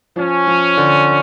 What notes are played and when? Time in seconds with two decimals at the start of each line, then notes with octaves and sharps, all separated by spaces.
0.16 F3 C#4
0.47 F3
0.77 D3